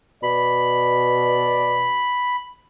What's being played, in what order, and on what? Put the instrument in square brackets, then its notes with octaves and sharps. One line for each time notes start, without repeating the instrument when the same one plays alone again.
[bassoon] B2 [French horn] D5 [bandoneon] B5